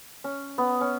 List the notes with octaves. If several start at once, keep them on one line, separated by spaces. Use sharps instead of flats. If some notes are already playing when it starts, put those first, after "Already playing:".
C#4
B3
C#4